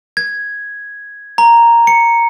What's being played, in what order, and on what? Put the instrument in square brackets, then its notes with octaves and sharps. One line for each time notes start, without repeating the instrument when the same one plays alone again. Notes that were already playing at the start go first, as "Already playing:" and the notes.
[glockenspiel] G#6
A#5
C#7